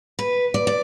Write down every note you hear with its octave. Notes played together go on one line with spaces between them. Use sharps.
B4
D5
D5